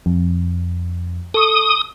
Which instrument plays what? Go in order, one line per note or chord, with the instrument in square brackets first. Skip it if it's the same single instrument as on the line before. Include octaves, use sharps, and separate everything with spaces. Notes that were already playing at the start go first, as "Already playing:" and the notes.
[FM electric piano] F2
[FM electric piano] A4 C#6 [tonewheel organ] D#6